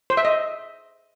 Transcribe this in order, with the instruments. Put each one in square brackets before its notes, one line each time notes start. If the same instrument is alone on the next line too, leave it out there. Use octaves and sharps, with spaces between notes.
[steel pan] C5
E5
D#5